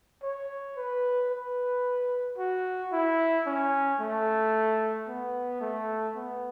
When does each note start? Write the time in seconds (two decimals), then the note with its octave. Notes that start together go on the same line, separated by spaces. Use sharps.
0.23 C#5
0.77 B4
1.31 B4
2.38 F#4
2.92 E4
3.46 C#4
4.00 A3
5.08 B3
5.61 A3
6.16 B3